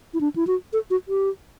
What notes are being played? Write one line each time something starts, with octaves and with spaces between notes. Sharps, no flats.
E4
D4
E4
F#4
A4
F#4
G4